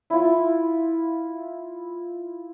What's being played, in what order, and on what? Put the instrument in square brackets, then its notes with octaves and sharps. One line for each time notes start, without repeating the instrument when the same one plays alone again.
[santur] E4 F4